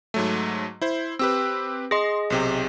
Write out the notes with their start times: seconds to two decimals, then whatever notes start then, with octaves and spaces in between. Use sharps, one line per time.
0.14 G#2 F#3 A3
0.82 E4 C5
1.19 C4 G4 B4 E6
1.91 G#4 D#5 C6 A#6
2.30 B1 C3 G4